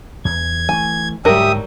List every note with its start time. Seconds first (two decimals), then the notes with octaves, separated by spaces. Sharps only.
0.25 E2 G#6
0.69 E3 G#3 A3 G#5
1.25 D2 G#2 F#3 G3 G4 A#4 E5 D#6